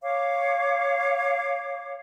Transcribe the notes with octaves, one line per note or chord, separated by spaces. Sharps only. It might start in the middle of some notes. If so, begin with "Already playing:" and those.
C#5 F5 D6